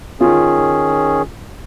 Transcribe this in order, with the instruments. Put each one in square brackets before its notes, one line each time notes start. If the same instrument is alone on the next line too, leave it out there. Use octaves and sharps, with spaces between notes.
[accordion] D#3 C#4 G#4 [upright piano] F4